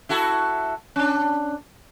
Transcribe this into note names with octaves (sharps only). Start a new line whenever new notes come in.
E4 F#4 A4
C#4 D4